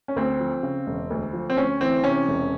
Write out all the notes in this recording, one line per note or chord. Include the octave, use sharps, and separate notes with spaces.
C#4
D2 C4
F3
C#3
E1
D2
F3
C4
D2 C#4
E3 C4
C3 C#4
E1